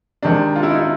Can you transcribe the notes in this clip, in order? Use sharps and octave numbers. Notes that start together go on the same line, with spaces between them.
C3 D#3 G#3 D4
F4
E4
D#4
E4